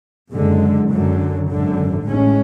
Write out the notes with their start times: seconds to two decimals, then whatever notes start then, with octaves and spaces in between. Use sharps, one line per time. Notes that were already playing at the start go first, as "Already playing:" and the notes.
0.32 F#1 F#2 D3 G#3
0.90 F#2 D3 F#3
1.48 G#1 F#2 D3
2.06 A1 A2 G#3 C#4